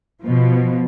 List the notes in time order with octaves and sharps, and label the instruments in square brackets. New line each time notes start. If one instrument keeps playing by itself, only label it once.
[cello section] B2 F3